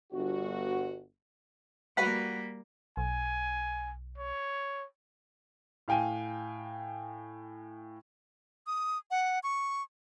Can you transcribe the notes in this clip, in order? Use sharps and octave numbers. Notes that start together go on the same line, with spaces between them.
G1 F#4
G3 A#3 F#4 B4 F#5 B6
B1 G#5
C#5
A2 F5 G5 G#5 D#7
D#6
F#5
C#6